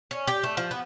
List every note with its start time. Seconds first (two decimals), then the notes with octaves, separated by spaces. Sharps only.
0.11 C#4
0.28 G4
0.43 A3
0.57 F3
0.71 B3